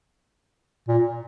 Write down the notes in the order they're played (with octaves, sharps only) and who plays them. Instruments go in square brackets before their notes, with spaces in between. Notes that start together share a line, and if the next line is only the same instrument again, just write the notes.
[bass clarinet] A#2